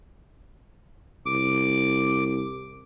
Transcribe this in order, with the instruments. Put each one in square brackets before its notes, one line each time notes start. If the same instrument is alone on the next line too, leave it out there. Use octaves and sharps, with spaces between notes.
[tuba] C2 [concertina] D6